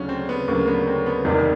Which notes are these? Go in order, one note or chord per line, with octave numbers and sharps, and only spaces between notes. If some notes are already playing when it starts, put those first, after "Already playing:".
Already playing: D2 C#3 F#3 C#4 D4
C4
B3
D2 C#3 F#3 A#3
B3
C4
B3
E1 E2 C3 D#3 G3 A#3